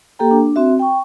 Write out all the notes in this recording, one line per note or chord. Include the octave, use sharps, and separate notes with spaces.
A#3 G4 A4 G5 A#5
D4
C4 F#4 E5
G5 C#6